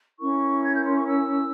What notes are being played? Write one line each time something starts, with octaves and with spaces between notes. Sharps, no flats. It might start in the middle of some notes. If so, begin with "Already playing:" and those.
C#4 E4 A#4 C#6
G#6
G6
C6
C#6
E6